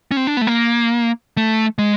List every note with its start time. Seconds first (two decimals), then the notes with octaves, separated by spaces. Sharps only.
0.11 C#4
0.17 C4
0.27 D4
0.37 B3
0.41 A3
0.47 A#3
1.37 A3
1.79 G#3